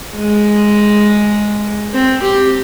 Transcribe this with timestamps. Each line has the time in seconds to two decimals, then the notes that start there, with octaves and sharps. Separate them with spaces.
0.16 G#3
1.93 C4
2.23 G4